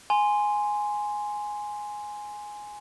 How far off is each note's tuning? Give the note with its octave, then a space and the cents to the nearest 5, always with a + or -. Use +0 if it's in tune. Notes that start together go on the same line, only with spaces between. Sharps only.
G#5 +0 C6 -5